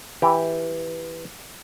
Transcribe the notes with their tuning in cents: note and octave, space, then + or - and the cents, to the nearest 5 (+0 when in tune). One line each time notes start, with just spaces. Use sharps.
E3 +0 G4 +0